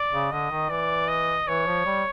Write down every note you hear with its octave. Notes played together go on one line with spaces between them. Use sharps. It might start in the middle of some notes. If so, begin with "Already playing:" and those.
Already playing: D5
C#3
D3 D#5
D#3
E3 D5
D#5
E3 C#5
F3
G3